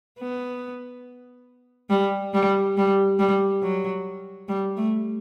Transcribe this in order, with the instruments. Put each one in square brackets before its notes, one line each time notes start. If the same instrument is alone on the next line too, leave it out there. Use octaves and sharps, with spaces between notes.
[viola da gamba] B3
G3
G3
G3
G3
F#3
G3
A3